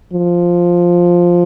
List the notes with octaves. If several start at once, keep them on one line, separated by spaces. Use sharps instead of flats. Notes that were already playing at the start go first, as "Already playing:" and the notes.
F3